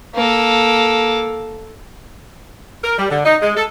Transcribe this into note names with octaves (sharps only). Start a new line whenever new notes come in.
A#3 A4
A#4
G3
D3
D#4
G#3
A4